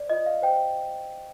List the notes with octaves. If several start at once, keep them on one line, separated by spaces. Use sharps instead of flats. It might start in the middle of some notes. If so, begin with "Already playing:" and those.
Already playing: C5 D5
F4 D#5
F5
C5 G5